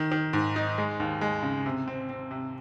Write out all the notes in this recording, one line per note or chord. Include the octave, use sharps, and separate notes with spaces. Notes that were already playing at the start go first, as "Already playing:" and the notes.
Already playing: D#3
D#3
G#2
D#4
G#3
D#2
G#3
C#3
C3
C4
C4
C3